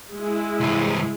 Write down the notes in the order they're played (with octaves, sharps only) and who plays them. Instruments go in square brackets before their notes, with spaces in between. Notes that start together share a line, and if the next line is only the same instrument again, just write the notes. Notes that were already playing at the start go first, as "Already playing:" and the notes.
[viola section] G#3 E4
[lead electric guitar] C2 G2